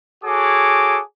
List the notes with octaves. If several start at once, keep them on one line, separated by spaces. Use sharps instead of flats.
F#4 G#4 A4 C#5 D6